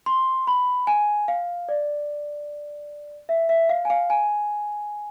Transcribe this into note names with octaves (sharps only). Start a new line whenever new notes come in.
C6
B5
G#5
F5
D5
E5
E5
F5
G#5
F5
G#5